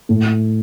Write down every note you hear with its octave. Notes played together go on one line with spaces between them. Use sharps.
A2